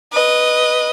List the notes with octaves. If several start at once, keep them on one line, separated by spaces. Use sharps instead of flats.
B4 D#5